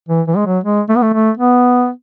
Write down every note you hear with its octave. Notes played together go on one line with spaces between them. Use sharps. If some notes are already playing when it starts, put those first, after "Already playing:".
E3
E3
G#3
F#3
G#3
A3
B3
A3
A3
B3